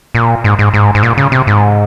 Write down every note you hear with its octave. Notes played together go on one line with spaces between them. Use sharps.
A#2
G#2
G#2
G#2
G#2
A#2
C#3
C3
G#2